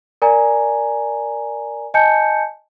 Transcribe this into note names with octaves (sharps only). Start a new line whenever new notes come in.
A#4 D5 G#5 A#5
D#5 G#5 A5 G6 C#7